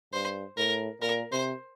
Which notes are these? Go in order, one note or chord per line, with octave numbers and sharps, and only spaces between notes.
G2 C5
A2 A#4
A#2 A#4
C3 C5